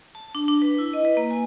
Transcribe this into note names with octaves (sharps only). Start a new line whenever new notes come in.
A5
D4
D4
B4
E4
D#5
B4
A#3
G#5